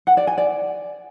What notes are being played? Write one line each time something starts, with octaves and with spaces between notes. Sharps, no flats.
F#5
D5
G#5
D5